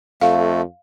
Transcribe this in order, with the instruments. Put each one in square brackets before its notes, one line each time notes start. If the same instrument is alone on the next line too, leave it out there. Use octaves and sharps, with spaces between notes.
[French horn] F2 [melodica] A3 [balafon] F5